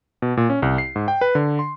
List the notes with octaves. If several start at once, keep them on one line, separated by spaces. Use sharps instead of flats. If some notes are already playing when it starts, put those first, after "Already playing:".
B2
A#2
C#4
C2
C7
G#2
G5
B4
D3
C6